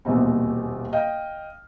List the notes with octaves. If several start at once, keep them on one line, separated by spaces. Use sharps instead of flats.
D#1 A#1 E2 B2 C4
D#5 F5 G5